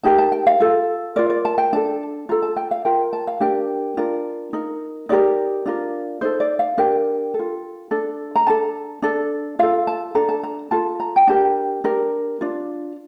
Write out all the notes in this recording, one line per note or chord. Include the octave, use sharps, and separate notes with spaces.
D#4 G4 A#4 A5
A5
G5
F5
F4 A4
F4 A#4 D5
D5
A5
G5
D4 A4 A5
F4 A4 A#5
A5
G5
F5
F4 A#4 G5
A5
F5
D4 G4 A#4 G5
D4 F4 A#4
D#4 A#4
D#4 G4 A#4 D5
D4 F4 A#4
D#4 A4 C5
D5
F5
D4 G4 A#4 G5
A4
F4
D4 A4
A#5
D4 A4 A5
D4 A4
F4 A4 F5
A5
D4 A4 A#5
A5
A#5
F4 A4 A5
A#5
G5
D4 G4 A#4 A5
D4 G4 A#4
D4 F4